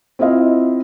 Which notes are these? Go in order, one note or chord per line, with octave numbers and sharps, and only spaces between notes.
C4 E4 F4 D#5 F5